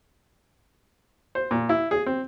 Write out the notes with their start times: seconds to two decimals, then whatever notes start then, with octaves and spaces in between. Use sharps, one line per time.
1.35 C5
1.51 A#2
1.69 E4
1.91 G#4
2.06 C4